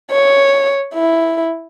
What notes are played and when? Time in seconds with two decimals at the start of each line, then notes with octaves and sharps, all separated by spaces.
0.11 C#5
0.94 E4